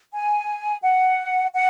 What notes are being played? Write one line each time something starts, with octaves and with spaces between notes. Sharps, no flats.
G#5
F#5
F#5